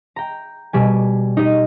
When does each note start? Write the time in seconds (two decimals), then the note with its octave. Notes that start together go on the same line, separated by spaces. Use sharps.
0.16 G5 A#5
0.73 B2 G3 G#5
1.37 D#4 G4 D#5